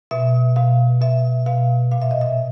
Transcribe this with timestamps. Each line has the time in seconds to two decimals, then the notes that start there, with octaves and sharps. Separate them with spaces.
0.11 B2 E5
0.56 B2 F5
1.01 B2 E5
1.46 B2 F5
1.92 A#2 F5
2.02 E5
2.11 D#5
2.21 E5